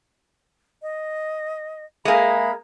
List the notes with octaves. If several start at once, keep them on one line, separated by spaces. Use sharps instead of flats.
D#5
G#3 A#3 G#4 E5 B5